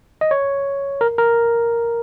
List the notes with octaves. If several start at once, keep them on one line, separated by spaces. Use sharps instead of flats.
D#5
C#5
A#4
A#4